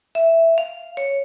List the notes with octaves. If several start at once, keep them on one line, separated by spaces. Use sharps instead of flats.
E5
F5
C#5